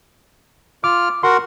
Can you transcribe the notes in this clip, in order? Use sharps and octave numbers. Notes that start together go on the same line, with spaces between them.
F4 D6 F6
F#4 A#4 F#5 C6